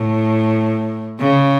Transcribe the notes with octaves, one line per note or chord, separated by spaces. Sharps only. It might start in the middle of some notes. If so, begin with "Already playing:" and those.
Already playing: A2
C#3